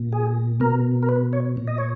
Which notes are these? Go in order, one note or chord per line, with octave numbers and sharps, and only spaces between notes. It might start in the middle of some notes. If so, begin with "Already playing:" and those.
Already playing: A#2
G#4
B2 A#4
A#4
B4
C#5
A#2
D#5
C#5